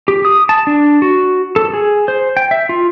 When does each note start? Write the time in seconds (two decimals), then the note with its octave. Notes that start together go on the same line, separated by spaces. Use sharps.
0.08 G4
0.25 D#6
0.49 A5
0.67 D4
1.02 F#4
1.56 A4
1.74 G#4
2.08 C5
2.37 G5
2.51 E5
2.69 F4